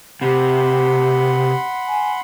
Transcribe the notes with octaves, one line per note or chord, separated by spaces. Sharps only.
C3 G4 F#5 B5 C6
G#5